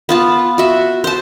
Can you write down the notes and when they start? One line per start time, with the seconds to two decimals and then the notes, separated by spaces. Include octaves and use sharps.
0.09 B3 F4 A5
0.58 F#4 E5
1.04 C5 A5